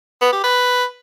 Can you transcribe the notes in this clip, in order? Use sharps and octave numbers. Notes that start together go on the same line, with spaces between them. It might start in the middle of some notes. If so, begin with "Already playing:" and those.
B3
G4
B4